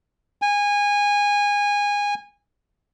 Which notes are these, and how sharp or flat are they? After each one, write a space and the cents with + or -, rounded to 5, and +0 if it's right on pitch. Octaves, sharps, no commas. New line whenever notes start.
G#5 -20